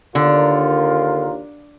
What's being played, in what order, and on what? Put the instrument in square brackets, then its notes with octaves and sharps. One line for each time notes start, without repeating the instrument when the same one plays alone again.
[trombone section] D#2 F4 A#4 [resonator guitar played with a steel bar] D3